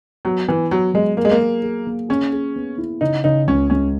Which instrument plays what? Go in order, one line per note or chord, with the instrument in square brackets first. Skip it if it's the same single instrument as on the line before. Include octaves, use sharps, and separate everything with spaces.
[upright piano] F#3 [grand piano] B3
[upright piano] E3 [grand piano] B3
[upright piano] F#3 [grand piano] B3
[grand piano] F#3 [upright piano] G#3
[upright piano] A#3 [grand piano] G#4
[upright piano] G#3
A#3
[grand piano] G#4
G#4
A#3
[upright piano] C#4 [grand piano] G#4
[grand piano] G#4
B3
E4
[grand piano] C#3 [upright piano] D#4
[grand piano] C#3 [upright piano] D#4
[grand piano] C#2 [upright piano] C#4
[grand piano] G#3 [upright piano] C#4